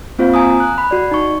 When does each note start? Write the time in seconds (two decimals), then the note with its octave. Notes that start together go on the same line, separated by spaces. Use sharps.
0.19 A#3 C4 F4 C5 F5
0.34 G#5 A#5 D#6
0.60 F#6
0.78 B5
0.91 F#4 D5
1.11 D#4 C#6